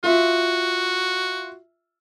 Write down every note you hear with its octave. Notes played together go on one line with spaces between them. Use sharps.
F4 F#4 E5